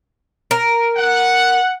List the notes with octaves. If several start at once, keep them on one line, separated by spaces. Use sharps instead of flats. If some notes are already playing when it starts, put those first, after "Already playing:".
A#4
F#5